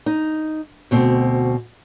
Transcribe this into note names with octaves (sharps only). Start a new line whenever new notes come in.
D#4
D2 B2 C4